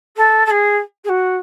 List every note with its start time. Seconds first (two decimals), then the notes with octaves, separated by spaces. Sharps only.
0.16 A4
0.46 A4
0.50 G#4
1.04 G#4
1.09 F#4